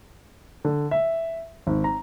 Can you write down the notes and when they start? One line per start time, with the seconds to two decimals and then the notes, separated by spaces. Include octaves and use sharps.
0.65 D3
0.91 E5
1.67 G#1
1.84 A#5